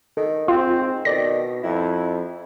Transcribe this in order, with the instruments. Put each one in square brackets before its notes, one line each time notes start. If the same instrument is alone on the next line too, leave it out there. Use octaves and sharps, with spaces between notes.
[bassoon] D#3 [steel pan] A4
[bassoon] G#2 [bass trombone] C4 [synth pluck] F4
[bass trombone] B2 [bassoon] D#3 [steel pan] A4 D5 [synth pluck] A#6
[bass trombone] F2 [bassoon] E4